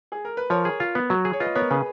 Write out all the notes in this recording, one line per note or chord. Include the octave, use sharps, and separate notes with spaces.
G#4
A#4
B4
F3 A#4 C#5
G#4
F4
B3
F#3
G#4
C#5
F4 B4 D#5
B3 A#4 C#5
C#3 G#4 B4